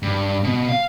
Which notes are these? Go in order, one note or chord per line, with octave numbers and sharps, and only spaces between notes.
G2
B2
F5